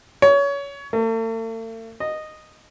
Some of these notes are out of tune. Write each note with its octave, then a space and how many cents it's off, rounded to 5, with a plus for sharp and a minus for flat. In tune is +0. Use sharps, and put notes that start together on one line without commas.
C#5 +25
A3 +45
D#5 -10